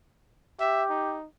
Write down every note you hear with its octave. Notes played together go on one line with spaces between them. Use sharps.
G4 E5
D#4